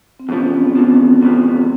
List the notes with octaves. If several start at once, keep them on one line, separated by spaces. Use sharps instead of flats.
C4
E2 C3 F3 C#4
C4
B3
E2 C3 F3
E2 C3 F3 C4